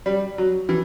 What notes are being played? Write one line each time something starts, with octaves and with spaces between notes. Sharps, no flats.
G3
F#3
E3